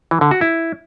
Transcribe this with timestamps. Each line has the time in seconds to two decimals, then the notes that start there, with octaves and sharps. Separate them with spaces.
0.11 E3
0.21 D3
0.31 F#4
0.41 E4